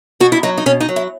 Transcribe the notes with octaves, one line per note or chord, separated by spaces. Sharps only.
B2 F#4
E4
F#3 D#4
D#4
B2 C#4
D#4
F#3
E4